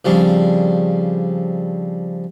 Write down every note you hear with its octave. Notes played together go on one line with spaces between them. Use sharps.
C#3 F3 G3 C4 D4